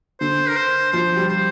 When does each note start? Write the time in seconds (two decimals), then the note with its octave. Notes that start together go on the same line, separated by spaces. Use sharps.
0.20 D3 C5
0.48 A#4
0.56 C5
0.92 F3 C5
1.16 G3
1.29 C5